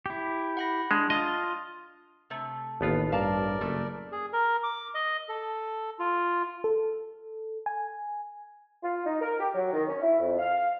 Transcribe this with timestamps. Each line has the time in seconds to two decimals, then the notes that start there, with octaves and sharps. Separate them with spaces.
0.06 E4 G4
0.57 F#5 B5 A#6
0.91 G#3 D4
1.10 F4 D#5 C6 D#6 A6
2.30 C3 A3
2.81 A1 D#2 B3 F4
3.12 G2 A#4 D5 F5 A5 A#5
3.61 F#1 B2 A3
4.12 G#4
4.33 A#4
4.63 D6
4.95 D#5
5.29 A4
5.99 F4
6.64 A4
7.66 G#5
8.83 F4
9.05 D#4
9.21 A#4
9.39 G4
9.54 F#3
9.73 D#3
9.88 C#4
10.01 E4
10.20 F2
10.39 F5